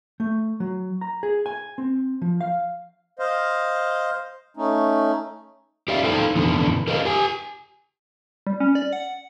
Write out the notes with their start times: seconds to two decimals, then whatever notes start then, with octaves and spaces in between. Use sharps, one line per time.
0.20 A3
0.60 F#3
1.01 A#5
1.23 G#4
1.46 G#5
1.78 C4
2.22 F3
2.41 F5
3.19 C5 D#5 F5
4.57 A3 C#4 D#4
5.88 G4 D5 E5 F5
6.04 D#4 E4 A4 C5 F5 G5
6.36 F2 B2 D3 E3
6.88 G#4 A#4 C5 D#5 F5
7.05 G4 G#5
8.47 G3
8.60 C#4
8.75 D5
8.93 F#5